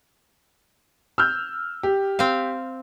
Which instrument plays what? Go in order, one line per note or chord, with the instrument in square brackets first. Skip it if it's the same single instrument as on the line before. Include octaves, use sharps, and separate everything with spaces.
[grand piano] E6 F6 G6
G4
[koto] C4 F5